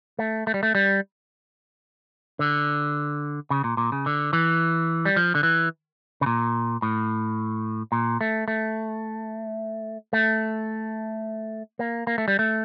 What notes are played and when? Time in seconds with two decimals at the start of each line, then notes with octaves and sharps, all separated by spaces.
0.19 A3
0.47 A3
0.54 G3
0.63 A3
0.75 G3
2.39 D3
3.50 C#3
3.64 A#2
3.77 A#2
3.92 C#3
4.06 D3
4.33 E3
5.05 G3
5.16 F3
5.35 D3
5.43 E3
6.21 C#3
6.26 A#2
6.82 A2
7.92 A#2
8.21 A3
8.48 A3
10.13 A3
11.79 A#3
12.07 A#3
12.18 A3
12.28 G3
12.39 A3